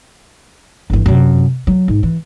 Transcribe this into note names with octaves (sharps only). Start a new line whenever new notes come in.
G1 E3
F#2 C3
F#3
G#2
E3